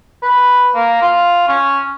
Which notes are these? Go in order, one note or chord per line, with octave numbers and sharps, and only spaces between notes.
B4
A#3
F4
C#4